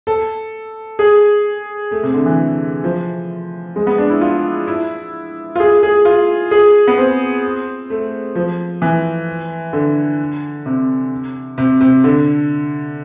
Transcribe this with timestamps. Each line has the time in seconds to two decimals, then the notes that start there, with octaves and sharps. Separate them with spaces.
0.07 A4
0.99 G#4
1.91 A3
2.03 C3
2.14 D3
2.26 E3
2.84 F3
3.76 G#3
3.87 B3
3.98 D4
4.10 E4
4.21 F4
4.68 E4
5.56 F4
5.60 G#4
5.83 G#4
6.05 F4
6.51 G#4
6.88 B3
6.98 C4
7.90 A3
8.35 F3
8.82 E3
9.73 D3
10.66 C3
11.58 C3
11.81 C3
12.04 D3